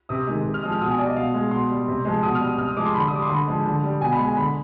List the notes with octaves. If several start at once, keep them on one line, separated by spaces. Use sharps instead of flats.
C3 D#6
D#3 G#3
C3
F6
F3 G#3 D#6
F6
B2 D#6
G#5
G3 D5
D#5
B2 F5
G#3
B2 C6
G3
C3
F3 G#3
B2 D#6
F6
G3
D#6
C3 F6
D#6
F3 G#3 D6
C6
D3 B5
D#6
G3 D6
C6
D3 B5
F3 G#3
D3
G3
B2 G#5
B5
G#3
G#5
D3 B5